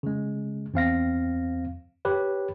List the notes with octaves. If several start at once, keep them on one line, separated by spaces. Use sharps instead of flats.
C#3 G#3
E2 C4 F5 A#6
G4 B4 C#5